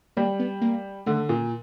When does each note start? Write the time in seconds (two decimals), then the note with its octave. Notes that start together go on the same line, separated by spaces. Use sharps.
0.17 G3 A#3
0.39 B3
0.61 A#3
1.06 D3 A3
1.29 A#2